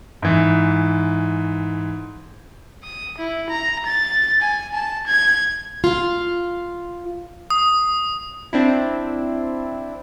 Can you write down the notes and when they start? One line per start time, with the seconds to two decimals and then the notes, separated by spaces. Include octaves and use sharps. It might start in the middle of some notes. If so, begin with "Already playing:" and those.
0.22 G#2 E3
2.84 D#6
3.18 E4
3.50 A#5
3.86 A6
4.42 G#5
4.74 A5
5.07 G#6
5.84 F4 F5
7.50 D#6
8.53 C4 D4 E4